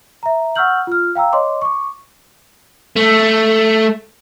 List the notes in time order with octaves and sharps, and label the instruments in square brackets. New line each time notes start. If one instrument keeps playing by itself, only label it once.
[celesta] E5 A#5
F#5 C#6 E6 F6 G6 F#7
F4 F6
F5 G5 A#5 E6
C#5 D#5 C6 D6
C#6 D6
[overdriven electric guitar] A3